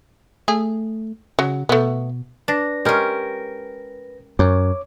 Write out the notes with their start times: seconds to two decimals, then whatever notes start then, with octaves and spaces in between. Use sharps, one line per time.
0.48 A3 G#4
1.39 C#3 F#3
1.69 B2 A3 B3
2.48 D4 B4 A#6
2.85 G#3 C#4 G4 A#4
4.39 F#2 C#5 D6